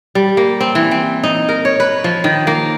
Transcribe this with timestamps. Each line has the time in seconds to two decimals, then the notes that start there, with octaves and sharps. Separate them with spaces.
0.15 G3
0.37 A#3
0.61 C4
0.75 E3
0.91 C4
1.24 D#4
1.49 A#4
1.65 C#5
1.80 B4
2.04 F3
2.24 D#3
2.47 A#3